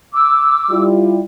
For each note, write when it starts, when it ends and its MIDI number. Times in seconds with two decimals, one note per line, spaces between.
0.13 0.84 86
0.13 0.84 88
0.71 1.22 55
0.71 1.22 64
0.71 1.22 65